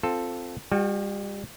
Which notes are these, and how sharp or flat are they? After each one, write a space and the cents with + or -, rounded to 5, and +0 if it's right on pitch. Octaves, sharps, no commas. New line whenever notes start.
C4 +0 F4 +0 A4 +0
G3 +35 F#4 -25 G5 -10